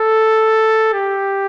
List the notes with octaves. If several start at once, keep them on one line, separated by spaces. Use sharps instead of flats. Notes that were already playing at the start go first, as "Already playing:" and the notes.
Already playing: A4
G4